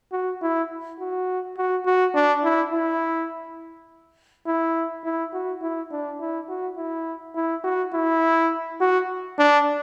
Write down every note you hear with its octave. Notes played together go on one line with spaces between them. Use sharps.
F#4
E4
F#4
F#4
F#4
D4
E4
E4
E4
E4
F#4
E4
D4
E4
F#4
E4
E4
F#4
E4
F#4
D4